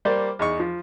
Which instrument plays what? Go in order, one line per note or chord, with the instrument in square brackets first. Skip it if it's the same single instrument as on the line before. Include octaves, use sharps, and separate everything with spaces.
[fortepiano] G3 A#3 C5 D5
E2 D#4 C#6
F3